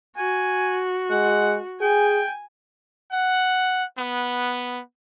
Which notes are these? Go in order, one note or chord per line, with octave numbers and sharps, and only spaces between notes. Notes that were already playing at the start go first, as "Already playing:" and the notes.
F#4 G#5
G#3 F#5
G#4 G5 G#5
F#5
B3